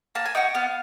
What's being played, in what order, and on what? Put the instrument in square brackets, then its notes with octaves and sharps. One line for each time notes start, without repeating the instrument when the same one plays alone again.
[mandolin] A#3 A5
G#5
D#4 F#4 G5
B3 F5